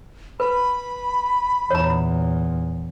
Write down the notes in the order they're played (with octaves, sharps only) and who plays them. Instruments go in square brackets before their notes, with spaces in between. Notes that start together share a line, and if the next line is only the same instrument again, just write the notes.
[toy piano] B4 [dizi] B5
[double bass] E2 A#2 [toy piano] C#5 A#5